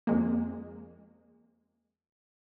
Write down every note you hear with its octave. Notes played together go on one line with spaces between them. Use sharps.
F2 G#3 A#3